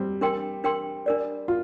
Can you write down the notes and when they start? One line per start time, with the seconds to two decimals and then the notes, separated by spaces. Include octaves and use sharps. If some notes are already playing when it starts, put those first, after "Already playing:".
Already playing: G3 C4
0.21 D4 A#4 G5 C6
0.64 D4 A#4 G5 C6
1.06 D4 A#4 D5
1.48 F4